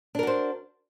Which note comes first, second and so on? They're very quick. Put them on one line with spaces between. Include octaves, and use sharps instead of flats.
D4 A#4 F#4 C5